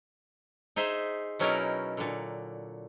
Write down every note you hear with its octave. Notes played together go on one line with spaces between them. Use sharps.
D#4 G#4 C5 E5
B2 F#3 C#4 D#4 E4 A#4
A#2 D3